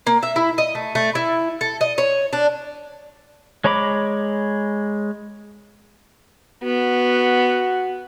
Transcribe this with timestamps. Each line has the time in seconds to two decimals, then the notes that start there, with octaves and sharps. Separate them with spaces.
0.07 A#3
0.23 E5
0.36 E4
0.58 D#5
0.75 A3
0.95 A3
1.15 E4
1.61 A4
1.81 D#5
1.98 C#5
2.33 D4
3.64 G#3 C#5 A#5 B5 D6
6.63 B3 F#4